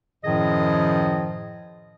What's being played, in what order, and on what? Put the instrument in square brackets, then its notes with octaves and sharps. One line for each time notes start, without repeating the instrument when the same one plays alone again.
[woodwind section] F#2 A2 D#3 F3 G#4 D#5